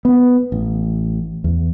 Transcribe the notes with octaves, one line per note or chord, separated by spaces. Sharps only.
B3
A1
E2